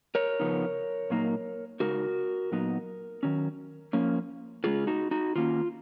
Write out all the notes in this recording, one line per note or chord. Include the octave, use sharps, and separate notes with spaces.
A#4 C#5
C#3 F3 B3 D#4
A#2 F#3 A#3 D#4
C#3 G#3 D#4 F#4 A#4
A#2 F#3 B3 D#4
D#3 F#3 C#4
F3 A#3 C#4
C#3 G#3 C#4 F4 G#4
D#4 F#4
D#4 F#4
D#3 A#3 C#4 F4